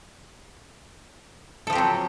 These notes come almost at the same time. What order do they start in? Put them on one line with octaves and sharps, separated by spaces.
A4 F3 G4 C4 F#3